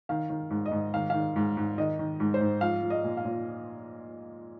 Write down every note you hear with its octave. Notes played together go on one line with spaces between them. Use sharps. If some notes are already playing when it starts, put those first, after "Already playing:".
D#3 F5
D#3
G#2
D#5
G#2
D#3 F5
D#3 F5
G#2
G#2
D#3 D#5
D#3
G#2
C5
G#2
F3 F5
F3
D#5
A#2
F5
A#2